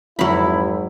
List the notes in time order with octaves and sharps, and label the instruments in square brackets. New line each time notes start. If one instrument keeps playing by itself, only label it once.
[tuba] G#1 [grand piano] F2 [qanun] F#3 B5 [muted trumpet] E4